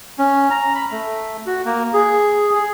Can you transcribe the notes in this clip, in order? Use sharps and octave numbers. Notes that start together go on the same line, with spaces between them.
C#4
A#5
B5
A3
F#4
A#3
G#4
G#4